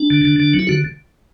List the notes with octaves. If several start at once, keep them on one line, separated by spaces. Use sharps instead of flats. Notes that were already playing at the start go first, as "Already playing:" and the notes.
Already playing: D4
D3
D3
D3
F#3
E4
D3 F#4